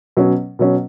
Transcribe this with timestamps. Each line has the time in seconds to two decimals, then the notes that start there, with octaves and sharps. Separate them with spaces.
0.17 B2 F#3 C#4
0.59 B2 F#3 C#4